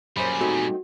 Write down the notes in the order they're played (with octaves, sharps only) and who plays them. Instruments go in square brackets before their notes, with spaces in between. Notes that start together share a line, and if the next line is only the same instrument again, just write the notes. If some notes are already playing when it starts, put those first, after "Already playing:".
[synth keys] F#2 C5 [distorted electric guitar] A#2 G3 [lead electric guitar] G#4 [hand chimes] B5
[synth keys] A3 C4 D#4 [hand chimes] F#4